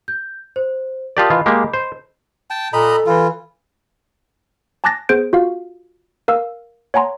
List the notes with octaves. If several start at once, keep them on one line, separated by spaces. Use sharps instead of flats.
G6
C5
F4 G4 A#4 D5 A5 D#6
E3 F4 D#5 B5
G#3 A#3 G4
C5
G5 A5
A#2 A4 D#5 A#5 B5
E3 F4
G#5 A5 D6 F#6 A6 A#6
B3 G#4 C5 G6 D7
F4 F#4 F5
A#4 F5 E6
C#5 F#5 G#5 A#5 C6